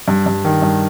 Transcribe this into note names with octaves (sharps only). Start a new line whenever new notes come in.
G2
G2
D#3
G2